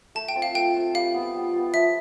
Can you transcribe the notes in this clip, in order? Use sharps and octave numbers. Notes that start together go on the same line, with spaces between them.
A3 A5
G5
C4 F4
F5
A3 G5
C4 F4
G3 F5
B3 F4
G3
B3 F4
F3 E5